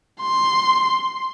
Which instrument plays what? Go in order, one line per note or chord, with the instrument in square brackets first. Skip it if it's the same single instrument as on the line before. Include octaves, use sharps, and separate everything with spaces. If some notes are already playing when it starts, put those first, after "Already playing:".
[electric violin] C6